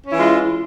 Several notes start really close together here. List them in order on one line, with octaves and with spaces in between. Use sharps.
C#4 E4 E3 F4 G#3